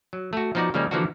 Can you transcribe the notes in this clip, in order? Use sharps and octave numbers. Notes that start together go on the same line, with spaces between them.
F#3
A3 F#4
F3 B3 D#4 F#4 D5
C#3 F3 G3 G#3 A#3
D3 E3 F3 A#3 D4 F#4